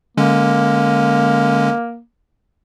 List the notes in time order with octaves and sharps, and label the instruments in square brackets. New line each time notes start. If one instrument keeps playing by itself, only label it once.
[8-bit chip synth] D3 G#3 C#4 [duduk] A#3